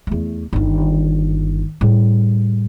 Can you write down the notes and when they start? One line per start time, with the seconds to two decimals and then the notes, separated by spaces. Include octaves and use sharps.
0.07 E2 A3
0.53 G1 D#3
1.81 A2 G3